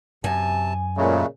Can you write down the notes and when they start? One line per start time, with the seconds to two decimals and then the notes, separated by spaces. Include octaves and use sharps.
0.24 F#2 C3 G#5 A5
0.97 A#2 C#3 F#3 G#3 A3